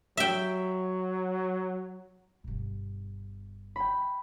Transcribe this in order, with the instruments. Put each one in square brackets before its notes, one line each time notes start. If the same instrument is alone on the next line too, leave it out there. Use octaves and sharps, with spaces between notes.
[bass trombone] F#3 [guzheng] E5 G5
[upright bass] G1 B2
[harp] G5 B5